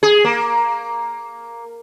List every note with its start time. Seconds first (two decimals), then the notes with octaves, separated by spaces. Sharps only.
0.03 G#4
0.24 A#3